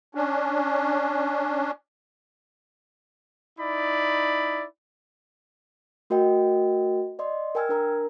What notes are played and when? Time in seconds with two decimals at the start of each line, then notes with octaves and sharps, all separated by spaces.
0.15 C#4 D4
3.59 D#4 E4 D5 B5
6.10 A3 F#4 A#4 D#5 G5
7.19 D5 D#5 C6
7.55 A#4 G5 G#5 E6 F6 G#6
7.69 D4 A#4 A#5